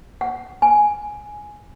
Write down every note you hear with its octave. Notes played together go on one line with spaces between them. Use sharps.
F#5
G#5